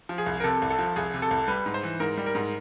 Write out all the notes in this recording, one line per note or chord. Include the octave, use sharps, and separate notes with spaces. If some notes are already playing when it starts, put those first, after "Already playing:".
F3
G#4
C2
A#4
C3 A4
C2
A4
F3
C2 G#4
C3
A4
C2
G3 B4
G#2
C5
E3
G#2 A#4
G3
A#4
G#2